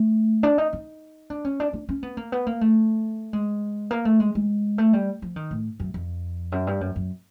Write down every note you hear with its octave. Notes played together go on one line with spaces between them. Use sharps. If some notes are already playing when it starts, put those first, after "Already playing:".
Already playing: A3
D4
D#4
D#4
D4
C#4
D4
D4
C#4
B3
A#3
B3
A#3
A3
G#3
A#3
A3
G#3
G#3
A3
G3
F3
D#3
A2
F#2
F2
F#2
G2
F#2
F#2